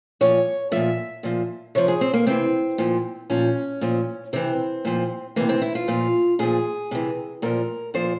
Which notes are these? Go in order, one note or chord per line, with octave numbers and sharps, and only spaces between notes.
A#2 F3 C#5
A#2 F3 E5
A#2 F3
C3 F3 C#5
G#4
C4
A#3
C3 E3 C4
A#2 F3
A#2 F3 C#4
A#2 F3
C3 E3 C4
A#2 F3
C3 E3 A#3
C4
E4
F4
A#2 F3
A#2 F3 G#4
C3 E3
A#2 F3 A#4
A#2 F3 C5